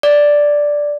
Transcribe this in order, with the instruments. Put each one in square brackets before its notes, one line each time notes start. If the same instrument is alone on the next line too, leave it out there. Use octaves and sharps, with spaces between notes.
[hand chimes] D5